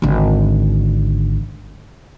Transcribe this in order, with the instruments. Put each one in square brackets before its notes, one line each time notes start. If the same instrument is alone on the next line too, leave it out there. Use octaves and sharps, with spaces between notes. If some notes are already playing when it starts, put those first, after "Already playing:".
[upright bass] G#1 D3